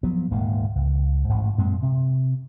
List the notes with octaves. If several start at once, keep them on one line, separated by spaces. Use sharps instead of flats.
F3 F#3 B3
D#1 D2 G#2 A#3
C#2
A1 G#2
F#2 A#2 G#3 C4
C3